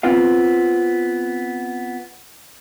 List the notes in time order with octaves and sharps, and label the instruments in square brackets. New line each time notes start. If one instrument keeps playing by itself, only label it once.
[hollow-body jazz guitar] B3 C4 F4 F5